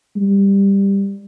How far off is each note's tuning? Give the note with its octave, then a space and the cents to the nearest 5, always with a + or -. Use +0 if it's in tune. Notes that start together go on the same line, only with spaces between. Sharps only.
G3 +10